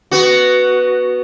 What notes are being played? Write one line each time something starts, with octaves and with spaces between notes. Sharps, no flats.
B3 F#4